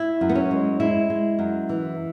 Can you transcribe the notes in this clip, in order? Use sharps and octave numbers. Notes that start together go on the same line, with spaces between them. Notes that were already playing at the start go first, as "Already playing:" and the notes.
Already playing: E4
F#2
B3
C#4
G#3
G#3 E4
G#3
F#2
E3